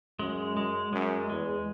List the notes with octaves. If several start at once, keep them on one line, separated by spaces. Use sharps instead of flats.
F#2 G#3
G#3
F#2 G#3
E2 G#3